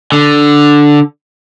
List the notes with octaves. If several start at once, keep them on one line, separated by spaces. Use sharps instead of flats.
D3